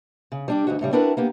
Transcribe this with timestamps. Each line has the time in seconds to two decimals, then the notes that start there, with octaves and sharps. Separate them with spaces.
0.32 C#3
0.48 G3 D4 G4
0.67 D2 G2 D#4 F#4
0.81 A2 C#3 G3
0.93 C4 D4 E4 F#4 A#4 B4
1.17 A#3 B3 G4